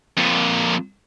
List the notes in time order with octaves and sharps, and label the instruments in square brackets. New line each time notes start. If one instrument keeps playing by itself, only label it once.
[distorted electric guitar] F2 A#2